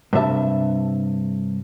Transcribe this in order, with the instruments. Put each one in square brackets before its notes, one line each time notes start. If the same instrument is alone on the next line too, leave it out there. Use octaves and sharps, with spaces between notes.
[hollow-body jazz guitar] G2 C3 E5 A5